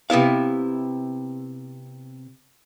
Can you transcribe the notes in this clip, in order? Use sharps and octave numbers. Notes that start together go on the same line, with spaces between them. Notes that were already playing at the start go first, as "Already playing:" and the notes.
C3 B3 E4 F5